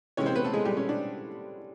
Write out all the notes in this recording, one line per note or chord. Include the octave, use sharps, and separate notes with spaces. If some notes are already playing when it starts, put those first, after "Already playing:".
C3 E3 G#3 C#4 C#5
C4 C5
B3 B4
A3 A4
G#3 G#4
G3 G4
C#4
D4